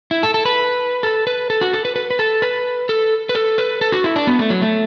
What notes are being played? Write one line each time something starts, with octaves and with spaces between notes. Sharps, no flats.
E4
A4
A4
B4
A4
B4
A4
F#4
A4
B4
B4
B4
A4
B4
A4
B4
A4
B4
A4
F#4
E4
D4
B3
A3
F#3
A3